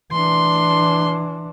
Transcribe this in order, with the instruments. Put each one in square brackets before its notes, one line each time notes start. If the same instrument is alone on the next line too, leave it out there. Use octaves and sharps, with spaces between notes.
[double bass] E3 D4 [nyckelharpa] C6